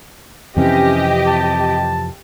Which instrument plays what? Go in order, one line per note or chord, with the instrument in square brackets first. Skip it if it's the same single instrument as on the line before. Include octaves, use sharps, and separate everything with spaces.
[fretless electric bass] F2 C3 E3 [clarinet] C#4 [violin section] G4 D#5
[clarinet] A5